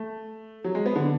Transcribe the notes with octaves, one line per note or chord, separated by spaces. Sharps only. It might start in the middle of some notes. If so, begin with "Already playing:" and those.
Already playing: A3
F#3
G#3
B3
D3